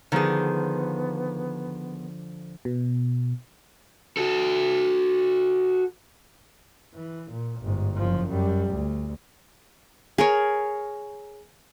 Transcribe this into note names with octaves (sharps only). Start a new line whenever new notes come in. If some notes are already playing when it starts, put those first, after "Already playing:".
D3 D#3 F3 B3 G#4
B2
F#4 A4
E3
A#2
G1 G#2
F#1 F3
F#2 G3
D2
G#4 A#4 C#5